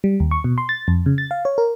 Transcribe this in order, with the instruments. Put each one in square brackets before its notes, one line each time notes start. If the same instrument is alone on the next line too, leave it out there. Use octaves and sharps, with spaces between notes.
[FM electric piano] G3
D#2
C#6
B2
C6
A6
F2
C#3
A6
F5
C#5
A#4